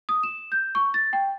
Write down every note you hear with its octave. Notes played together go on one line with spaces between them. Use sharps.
D#6
E7
G6
C#6
A6
G5